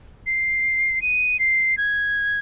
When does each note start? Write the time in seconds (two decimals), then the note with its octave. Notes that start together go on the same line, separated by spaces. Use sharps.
0.26 C7
1.02 D#7
1.39 C7
1.78 G#6